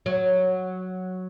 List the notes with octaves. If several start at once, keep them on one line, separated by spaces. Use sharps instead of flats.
F#3